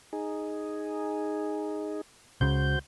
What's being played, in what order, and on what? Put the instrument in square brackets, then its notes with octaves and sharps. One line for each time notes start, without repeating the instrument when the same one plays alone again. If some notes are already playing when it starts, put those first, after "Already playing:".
[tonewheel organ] D#4 G#4
[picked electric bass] C#2 C#3 [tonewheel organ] F#4 C5 G6